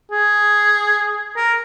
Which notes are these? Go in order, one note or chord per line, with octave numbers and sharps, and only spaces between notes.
G#4
A#4